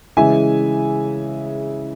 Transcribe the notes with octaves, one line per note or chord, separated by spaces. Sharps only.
C#3 E3 G#3 E5 G#5